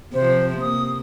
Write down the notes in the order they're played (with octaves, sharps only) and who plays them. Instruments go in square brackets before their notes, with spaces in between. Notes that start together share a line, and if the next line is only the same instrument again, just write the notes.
[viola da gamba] C3 F3 [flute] C5
[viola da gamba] A#3 [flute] D#6